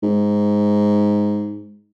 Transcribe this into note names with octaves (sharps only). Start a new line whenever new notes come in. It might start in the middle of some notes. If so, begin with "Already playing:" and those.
G#2